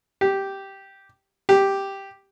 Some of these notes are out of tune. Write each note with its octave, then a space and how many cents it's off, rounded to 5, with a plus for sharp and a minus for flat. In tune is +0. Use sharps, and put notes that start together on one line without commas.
G4 -5
G4 +0